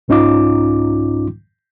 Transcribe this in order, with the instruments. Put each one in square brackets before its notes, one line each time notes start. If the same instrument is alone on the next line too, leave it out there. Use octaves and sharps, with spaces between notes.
[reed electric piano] C2 G#2 C#4 D#4 F4 D6